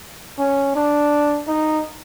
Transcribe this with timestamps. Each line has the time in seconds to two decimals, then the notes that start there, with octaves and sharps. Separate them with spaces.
0.39 C#4
0.76 D4
1.48 D#4